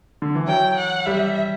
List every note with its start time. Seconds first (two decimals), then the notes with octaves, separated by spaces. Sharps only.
0.22 D3
0.35 E3
0.47 F#3 G5
0.77 F#5
1.06 G3 E5